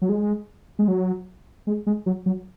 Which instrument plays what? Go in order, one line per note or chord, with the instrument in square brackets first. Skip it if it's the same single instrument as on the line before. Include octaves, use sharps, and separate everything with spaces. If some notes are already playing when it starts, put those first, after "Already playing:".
[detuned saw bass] F#3
G#3
G#3
F#3
G#3
G#3
F#3
F#3